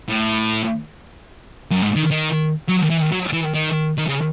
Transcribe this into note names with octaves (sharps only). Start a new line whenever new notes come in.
A2
F#2
G#2
D#3
D#3
F#3
E3
F#3
E3
D#3
D#3
C#3